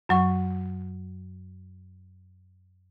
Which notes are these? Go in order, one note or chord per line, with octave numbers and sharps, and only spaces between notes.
F#2 F#3 C#6